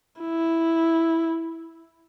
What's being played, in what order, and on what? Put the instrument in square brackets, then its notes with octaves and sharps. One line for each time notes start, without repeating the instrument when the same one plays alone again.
[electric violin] E4